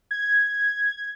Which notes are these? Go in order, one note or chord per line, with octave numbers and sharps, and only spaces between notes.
G#6